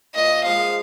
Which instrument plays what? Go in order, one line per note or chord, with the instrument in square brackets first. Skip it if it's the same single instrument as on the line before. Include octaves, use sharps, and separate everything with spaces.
[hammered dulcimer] A#2 [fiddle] D#5
[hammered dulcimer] F3 G#3 [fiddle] F5